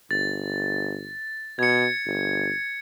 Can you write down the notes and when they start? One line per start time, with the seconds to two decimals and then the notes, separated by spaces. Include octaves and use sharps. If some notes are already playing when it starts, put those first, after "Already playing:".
0.11 G1 A6
1.59 B2 G#6 C#7
2.06 G1